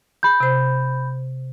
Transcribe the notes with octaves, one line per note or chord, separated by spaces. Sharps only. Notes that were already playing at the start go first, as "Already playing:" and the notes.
B5 G6
C3 C5